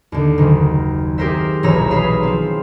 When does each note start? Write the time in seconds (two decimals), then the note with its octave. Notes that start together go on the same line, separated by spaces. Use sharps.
0.12 D#2 D3
0.38 F#1 D#3
1.18 C4 G4 G#4 A#4 C5 E5
1.63 D#1 B1 E3 C#5 A#5 E6
1.91 G#4 E5 F5 B5
2.23 F3 C4